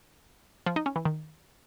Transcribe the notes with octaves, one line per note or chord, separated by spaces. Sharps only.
F3
D#4
C#4
E3
D#3